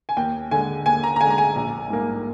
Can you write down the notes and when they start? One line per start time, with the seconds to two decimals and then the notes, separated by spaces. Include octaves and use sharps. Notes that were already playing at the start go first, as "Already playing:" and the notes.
0.09 G#5
0.17 D#2 G5
0.51 D3 G#3 G#5
0.86 D#2 G#5
1.04 A#5
1.16 A#5
1.21 D3 G#3 G#5
1.30 A#5
1.38 G#5
1.56 A#1
1.90 G#2 G3 A#3